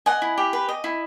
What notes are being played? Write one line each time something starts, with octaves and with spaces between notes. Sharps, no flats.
D#5 F#5 G#5
E4
G4
B4
D#5
E4